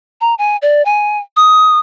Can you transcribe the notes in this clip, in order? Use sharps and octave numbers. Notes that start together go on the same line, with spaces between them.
A#5
G#5
D5
G#5
D#6